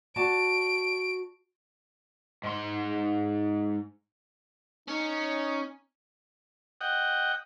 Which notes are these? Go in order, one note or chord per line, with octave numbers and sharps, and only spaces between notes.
F#4 D5 A5 D7
G#2 C6
C#4 D#4
D#5 F#5 G5